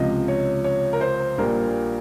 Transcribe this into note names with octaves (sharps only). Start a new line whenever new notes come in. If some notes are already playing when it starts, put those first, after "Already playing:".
Already playing: C#2 C3 F3 D#5
C#5
C#5
A#4
C5
A#1 A#2 G3 A#3 A#4